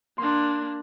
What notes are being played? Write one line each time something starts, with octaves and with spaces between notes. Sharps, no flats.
A#3 D4 C6